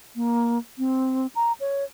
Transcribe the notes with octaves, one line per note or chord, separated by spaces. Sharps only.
A#3
C4
A#5
C#5